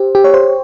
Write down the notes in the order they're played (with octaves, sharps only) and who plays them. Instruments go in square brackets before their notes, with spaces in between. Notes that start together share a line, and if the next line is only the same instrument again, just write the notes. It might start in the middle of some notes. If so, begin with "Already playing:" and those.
Already playing: [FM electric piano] G4 C5
G4
C#5
C5